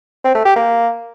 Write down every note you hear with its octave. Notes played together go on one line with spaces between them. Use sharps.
C4
A3
G4
A#3